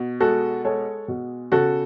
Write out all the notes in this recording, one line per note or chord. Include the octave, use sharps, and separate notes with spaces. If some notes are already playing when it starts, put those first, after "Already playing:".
Already playing: B2
G#3 F#4 A4
G#3 A4 C#5
B2
C#3 F#4 A4